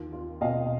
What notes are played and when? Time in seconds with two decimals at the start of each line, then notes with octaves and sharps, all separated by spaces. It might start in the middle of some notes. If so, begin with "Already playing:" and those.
Already playing: D#2 F4
0.13 F4
0.41 B2 D#5 F5